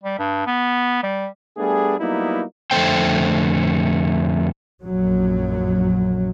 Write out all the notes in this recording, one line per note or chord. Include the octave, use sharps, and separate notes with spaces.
G3
G2
B3
G3
G3 A3 B3 D4 G#4
F#3 G3 A#3 B3 D#4 E4
F2 D3 A3 C5 G5
A#1 F#2 F#3